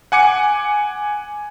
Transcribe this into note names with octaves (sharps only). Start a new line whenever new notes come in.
F#5 G#5 D6 C#7